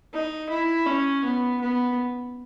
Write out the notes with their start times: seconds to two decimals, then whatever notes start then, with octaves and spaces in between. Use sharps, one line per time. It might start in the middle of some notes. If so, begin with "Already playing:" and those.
0.13 D#4
0.49 E4
0.86 C#4
1.24 B3
1.61 B3